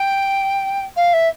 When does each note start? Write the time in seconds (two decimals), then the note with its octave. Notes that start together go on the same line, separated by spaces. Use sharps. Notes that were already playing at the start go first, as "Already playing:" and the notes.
Already playing: G5
0.96 F5
1.13 E5